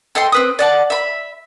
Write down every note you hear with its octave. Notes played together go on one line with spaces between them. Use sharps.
A4 D#5 G5 C6
C4 B4 D#6
D5 F#5 A5
E5 B5